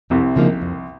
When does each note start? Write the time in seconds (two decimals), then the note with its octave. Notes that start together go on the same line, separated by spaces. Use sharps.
0.10 C2 F2 C3
0.36 C#3 F3 A#3 D#4
0.62 F2